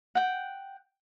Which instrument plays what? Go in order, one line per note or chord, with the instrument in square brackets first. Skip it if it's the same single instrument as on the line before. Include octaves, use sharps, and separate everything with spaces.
[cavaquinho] F#5 G5